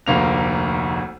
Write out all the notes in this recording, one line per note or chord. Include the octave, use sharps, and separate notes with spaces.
F1 D2 A#3 F7